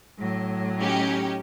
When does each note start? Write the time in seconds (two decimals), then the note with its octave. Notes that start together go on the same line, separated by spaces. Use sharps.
0.19 A2 F#3
0.79 C#4 D#4 G4